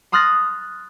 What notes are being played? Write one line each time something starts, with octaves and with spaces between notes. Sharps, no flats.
C6 D#6 F6 F#6 A6 A#6